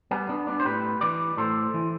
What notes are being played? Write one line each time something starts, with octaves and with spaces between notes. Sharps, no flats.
G3 B3
B3 D4
B3 D4
C5
A2 G4 B4
E3 B4 D5
A2 A4 C5
E3